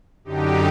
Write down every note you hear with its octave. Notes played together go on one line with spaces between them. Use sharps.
F#2 D3 D#4 G4